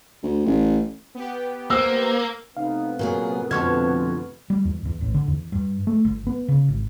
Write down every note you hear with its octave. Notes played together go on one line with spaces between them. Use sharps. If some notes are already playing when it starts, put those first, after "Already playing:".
D2
A1
B3 G4
A#3 C5 E6
C3 A3 B3 D#4 F5
A#2 F#3 G#4 A#4
F2 B2 D3 F4 C#6 F6 G#6
G3
E2
E2
A1
D3
E2
G2
A3
G1
B3
C#3
G#1